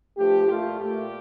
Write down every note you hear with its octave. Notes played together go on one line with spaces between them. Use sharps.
G2 F3 A3 G4
A#2 A3 F4
A#2 A3 G4